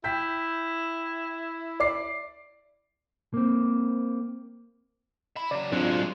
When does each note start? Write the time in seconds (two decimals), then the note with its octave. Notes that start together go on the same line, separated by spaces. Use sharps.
0.04 E4 G5 G6 B6
1.80 D5 D6 C7
3.34 A#3 C4
5.36 E5 B5
5.51 C#3 F#3 D5
5.73 F#3 G#3 C4 D4 F4